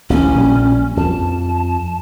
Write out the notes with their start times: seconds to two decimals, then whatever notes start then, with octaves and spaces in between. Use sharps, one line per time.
0.10 A1 D2 A#3 C#4
0.34 A#1 A#2 G3
0.97 F2 A5